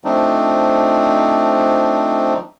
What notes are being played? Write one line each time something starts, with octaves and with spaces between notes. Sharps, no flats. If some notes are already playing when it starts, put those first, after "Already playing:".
F3 A3 C4 D4 D#4